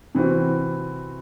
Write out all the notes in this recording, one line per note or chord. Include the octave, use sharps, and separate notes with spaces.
C3 E3 C4 F#4